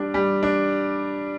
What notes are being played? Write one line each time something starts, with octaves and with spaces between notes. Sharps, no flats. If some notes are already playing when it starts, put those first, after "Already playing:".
Already playing: G3 D4
G3
D4